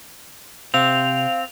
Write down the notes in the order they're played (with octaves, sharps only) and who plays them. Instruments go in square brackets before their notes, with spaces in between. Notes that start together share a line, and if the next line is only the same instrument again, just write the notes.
[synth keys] C3 [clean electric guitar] C4 [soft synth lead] F5 [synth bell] F7